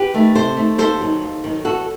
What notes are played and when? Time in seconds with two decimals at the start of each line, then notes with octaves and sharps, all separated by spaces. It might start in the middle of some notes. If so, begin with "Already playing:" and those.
Already playing: G4 B4
0.14 D#3 A3
0.35 C3 A4 C5
0.57 D#3 A3
0.78 D#2 A4 C5
1.01 D#3 F#3
1.21 D#2
1.44 D#3 F#3
1.64 E2 F#4 A4